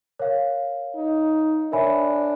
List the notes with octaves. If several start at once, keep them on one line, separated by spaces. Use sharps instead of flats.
A#4 C#5 F5
D#4
D4 A#4 C#5 E5 G#5 B5